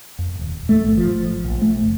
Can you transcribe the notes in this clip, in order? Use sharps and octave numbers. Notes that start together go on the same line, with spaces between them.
F2
D#1
A3
G#1
F3
G#1
A#1
A3
F#1